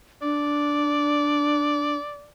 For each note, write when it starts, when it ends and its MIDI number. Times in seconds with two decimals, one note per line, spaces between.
0.22 1.95 62
0.22 2.31 74